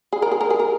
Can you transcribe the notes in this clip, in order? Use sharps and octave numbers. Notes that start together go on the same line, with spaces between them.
G#4
A#4
G#4
A#4
G#4
A#4